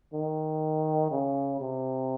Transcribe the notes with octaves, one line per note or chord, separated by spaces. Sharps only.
D#3
C#3
C3